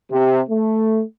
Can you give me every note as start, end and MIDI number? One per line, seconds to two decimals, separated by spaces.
0.12 0.40 48
0.50 1.02 57